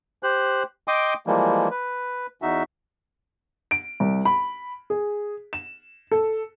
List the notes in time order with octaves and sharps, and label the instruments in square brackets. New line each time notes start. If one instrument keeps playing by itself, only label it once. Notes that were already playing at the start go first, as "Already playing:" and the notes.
[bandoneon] G4 C5 F#6
D#5 G5 C6 D6 D#6
E3 F3 G3 G#3 A#3
B4
E2 D#4 F#4 E5
[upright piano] D7
C2
B5
G#4
E7
A4